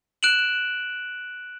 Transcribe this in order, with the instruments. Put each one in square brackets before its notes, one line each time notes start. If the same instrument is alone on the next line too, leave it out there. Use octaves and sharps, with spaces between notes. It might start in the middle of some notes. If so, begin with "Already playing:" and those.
[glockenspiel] F#6 D7 E7 F#7